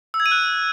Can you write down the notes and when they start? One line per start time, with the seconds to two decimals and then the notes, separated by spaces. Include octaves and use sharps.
0.14 E6
0.20 G#6
0.26 D#7
0.31 F#6